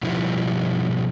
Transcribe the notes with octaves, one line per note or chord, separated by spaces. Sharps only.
B2 F3 G3 B3 D#4 E4